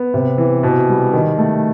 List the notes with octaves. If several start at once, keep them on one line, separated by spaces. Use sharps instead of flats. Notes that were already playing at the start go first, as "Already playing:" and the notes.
Already playing: B3
C3
E3
B2
G3
D#3
A3